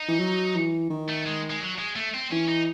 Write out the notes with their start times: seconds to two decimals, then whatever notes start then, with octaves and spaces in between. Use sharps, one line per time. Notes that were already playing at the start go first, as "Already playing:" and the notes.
Already playing: D#4
0.08 E3
0.20 F#3
0.56 E3
0.90 D#3
1.09 A3
1.26 G#3
1.50 G#3
1.60 F#3
1.78 G#3
1.96 A3
2.14 C4
2.32 E3 C#4
2.49 D#4